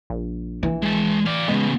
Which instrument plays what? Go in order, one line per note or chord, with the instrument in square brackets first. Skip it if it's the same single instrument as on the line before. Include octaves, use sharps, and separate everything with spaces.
[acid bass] A#1
[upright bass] E3
[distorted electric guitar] G#3 A5
D5 F5
[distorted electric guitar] C#3 B3 [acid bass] G#3